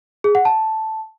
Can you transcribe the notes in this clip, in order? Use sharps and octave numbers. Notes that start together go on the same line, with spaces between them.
G#4
F#5
A5